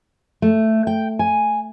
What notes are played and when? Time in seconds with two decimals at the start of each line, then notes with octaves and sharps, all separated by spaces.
0.42 A3
0.87 G5
1.19 G#5